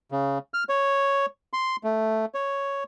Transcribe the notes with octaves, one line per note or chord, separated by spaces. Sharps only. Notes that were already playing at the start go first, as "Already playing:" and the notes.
C#3
F6
C#5
C6
A3
C#5